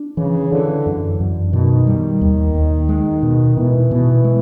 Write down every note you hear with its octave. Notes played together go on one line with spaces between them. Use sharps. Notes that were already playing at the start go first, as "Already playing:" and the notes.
Already playing: D4
C#3 E3
D3 E3
F#2
F#2
B2 D#3
G3
D#2
D#2
G#3
B2
B2 E3
B2
G#3